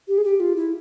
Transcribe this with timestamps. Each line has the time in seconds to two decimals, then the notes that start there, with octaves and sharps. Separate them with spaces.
0.08 G4
0.18 G#4
0.24 G4
0.40 F4
0.56 E4